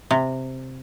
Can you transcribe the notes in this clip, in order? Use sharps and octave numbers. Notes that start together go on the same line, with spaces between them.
C3